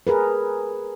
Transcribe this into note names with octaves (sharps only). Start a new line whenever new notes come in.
G#4 A#4 B4